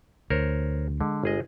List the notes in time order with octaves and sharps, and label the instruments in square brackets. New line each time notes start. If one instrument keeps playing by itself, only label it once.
[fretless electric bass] D2 [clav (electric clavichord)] A#4 C5 C#5
[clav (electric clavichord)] D3 [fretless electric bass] G#3
[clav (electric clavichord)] G1 G#4 D#5